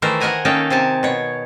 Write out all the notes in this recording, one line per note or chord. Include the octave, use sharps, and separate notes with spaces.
D#3 E3 A3 A#4 C5
A#4 D#5 F#5 G#5 A#5
D#3 A#3 C#4 D#4 A4 G5
C3 C4 G#5 A5
B2 C#5